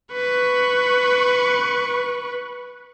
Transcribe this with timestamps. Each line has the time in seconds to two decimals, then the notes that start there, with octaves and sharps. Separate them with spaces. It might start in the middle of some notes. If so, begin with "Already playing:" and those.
0.12 B4 C#6